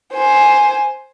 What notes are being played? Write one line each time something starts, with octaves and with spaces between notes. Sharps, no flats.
C5 G#5